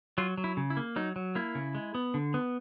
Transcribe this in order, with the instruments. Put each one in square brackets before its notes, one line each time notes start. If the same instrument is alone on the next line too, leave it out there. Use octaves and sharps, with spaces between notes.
[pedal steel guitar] F#3 F4
F#3
E4
C#3
E4
A#3
F#3 D#4
F#3
A#3 E4
C#3
G#3
B3
D3
B3